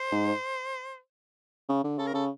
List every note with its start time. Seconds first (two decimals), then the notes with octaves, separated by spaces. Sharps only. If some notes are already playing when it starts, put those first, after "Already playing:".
Already playing: C5
0.12 G#2
1.69 C#3
1.84 D3
1.98 C#3 A4
2.07 A#4
2.14 C#3 A4